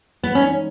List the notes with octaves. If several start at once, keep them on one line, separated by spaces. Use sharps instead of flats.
B3
E3 G#3 B3 C#4 D#4